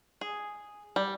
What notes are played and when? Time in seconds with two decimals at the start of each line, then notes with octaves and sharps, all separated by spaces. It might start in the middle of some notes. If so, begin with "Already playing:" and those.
0.21 G#4
0.96 G3